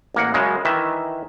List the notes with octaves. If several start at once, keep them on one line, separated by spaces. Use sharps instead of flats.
A1 A#3 F#5
F#2 C#3 G#3
D#3 E3 E5